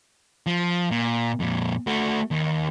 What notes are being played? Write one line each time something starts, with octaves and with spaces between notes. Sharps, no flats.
F3
A#2
F2 A#2
A3 F#4
D#2